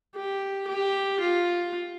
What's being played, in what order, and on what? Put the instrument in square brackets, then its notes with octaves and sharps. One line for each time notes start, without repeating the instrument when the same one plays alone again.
[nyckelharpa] G4
G4
F4